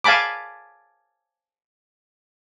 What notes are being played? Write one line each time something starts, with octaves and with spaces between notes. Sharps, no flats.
F5 G#5 A5 B5 D6